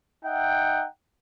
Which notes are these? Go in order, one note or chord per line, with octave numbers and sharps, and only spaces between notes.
D#4 E5 F#5 G5